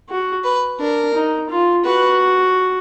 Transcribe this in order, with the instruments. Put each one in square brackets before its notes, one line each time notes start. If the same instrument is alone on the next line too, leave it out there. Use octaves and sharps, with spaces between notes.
[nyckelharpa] F#4
[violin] B4
[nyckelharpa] D4 [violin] A#4
[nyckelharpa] D#4
F4
[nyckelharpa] F#4 [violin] B4